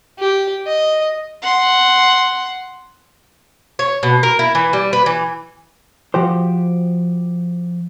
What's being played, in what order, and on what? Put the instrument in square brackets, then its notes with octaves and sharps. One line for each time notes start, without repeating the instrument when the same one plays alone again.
[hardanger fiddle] G4
D#5
F#5 C6
[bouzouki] C#5
B2
A#4
E4
E3
G3
B4
E3
[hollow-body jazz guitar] F3 F#4 G4 C5